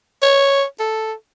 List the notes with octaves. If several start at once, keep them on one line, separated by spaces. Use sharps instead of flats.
C#5
A4